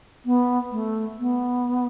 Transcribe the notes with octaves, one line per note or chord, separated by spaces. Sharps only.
B3
A3
B3